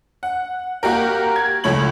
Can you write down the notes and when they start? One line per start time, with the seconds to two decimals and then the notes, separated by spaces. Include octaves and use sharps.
0.23 F#5
0.83 A#3 F#4 G4 A#4
1.36 G#6
1.64 C#2 F3 A3 C#5 B5 F#7